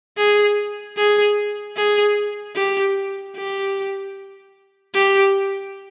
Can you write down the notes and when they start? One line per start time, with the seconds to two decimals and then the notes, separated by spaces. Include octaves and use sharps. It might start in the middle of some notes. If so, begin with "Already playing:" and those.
0.17 G#4
0.97 G#4
1.77 G#4
2.56 G4
3.36 G4
4.94 G4